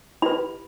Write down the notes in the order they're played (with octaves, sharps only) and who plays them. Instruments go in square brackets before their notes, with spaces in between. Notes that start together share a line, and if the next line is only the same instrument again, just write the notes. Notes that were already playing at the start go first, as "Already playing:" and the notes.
[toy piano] E4 G4 B4 B5